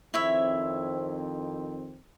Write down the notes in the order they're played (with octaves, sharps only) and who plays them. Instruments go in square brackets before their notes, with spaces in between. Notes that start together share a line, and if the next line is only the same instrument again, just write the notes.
[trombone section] F2 D#3 C4 [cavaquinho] E4 C#5 E5